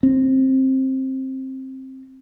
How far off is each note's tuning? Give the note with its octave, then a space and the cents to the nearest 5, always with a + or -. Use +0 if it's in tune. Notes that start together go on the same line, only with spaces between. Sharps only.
C4 +15